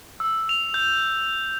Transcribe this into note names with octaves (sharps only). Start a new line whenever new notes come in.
E6
F7
G6